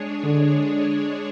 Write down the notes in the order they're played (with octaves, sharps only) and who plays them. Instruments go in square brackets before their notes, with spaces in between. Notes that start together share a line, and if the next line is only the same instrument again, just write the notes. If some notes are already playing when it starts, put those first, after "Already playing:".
Already playing: [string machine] G#3 D4 G#4 C#5
[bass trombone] D3